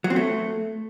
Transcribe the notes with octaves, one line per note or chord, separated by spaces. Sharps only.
F#3
C4
A3